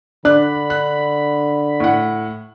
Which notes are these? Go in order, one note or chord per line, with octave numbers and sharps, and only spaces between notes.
D3 D4 B5 F#6
F#6
A2 F#5